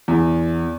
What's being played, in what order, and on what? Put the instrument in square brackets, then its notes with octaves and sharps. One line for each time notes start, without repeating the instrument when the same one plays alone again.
[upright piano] E2